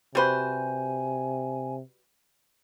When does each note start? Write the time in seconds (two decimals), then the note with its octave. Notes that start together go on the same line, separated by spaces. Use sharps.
0.15 C3 G3 F#4 B4 C5 G#5 B5